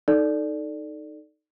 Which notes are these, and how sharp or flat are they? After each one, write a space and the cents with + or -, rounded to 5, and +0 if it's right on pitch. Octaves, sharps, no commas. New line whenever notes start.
D#4 -5 A4 +0 D5 +0